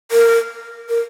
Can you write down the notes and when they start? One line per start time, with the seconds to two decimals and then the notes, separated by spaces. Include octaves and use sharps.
0.11 A#4
0.89 A#4